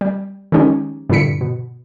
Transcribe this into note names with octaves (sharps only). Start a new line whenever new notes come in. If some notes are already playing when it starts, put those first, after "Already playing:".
G3
D#3 F3 G#3 C#4 D#4 G4
G2 A#2 D3 E4 B6 C#7
B2